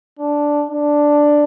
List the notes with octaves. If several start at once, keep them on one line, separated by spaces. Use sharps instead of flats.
D4
D4